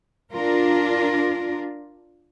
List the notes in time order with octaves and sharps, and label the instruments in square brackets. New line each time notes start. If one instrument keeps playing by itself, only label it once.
[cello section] D4 F4 A#4